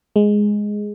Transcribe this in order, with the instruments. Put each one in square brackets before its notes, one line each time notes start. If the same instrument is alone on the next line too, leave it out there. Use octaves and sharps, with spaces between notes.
[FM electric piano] G#3